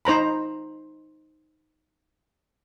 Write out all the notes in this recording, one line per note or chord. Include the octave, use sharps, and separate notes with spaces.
D#4 C5 A#5 B5